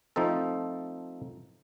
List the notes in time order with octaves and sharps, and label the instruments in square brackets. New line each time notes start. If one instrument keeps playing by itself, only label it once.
[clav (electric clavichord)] F3 A3 C4 D#4 A4